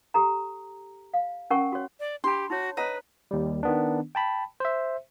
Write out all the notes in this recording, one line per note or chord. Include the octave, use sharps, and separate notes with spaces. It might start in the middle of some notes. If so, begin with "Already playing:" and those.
G4 A4 A#5
F5
C#4 A#4 F#5 G#5 C#6
F#4 C#5
D5
D4 G4 B5 C6
D#4 F#4 C#5
B4 C#5 D#5 F#5 A#5
D#2 G3
D#3 B3 D4
G5 A5 B5
C5 E5